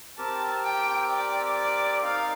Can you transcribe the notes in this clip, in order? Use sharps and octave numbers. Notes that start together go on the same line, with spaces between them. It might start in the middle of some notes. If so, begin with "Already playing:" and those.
C4 G4 A#4 A5
G5
D5
D5
D#4 A#4 D5 F5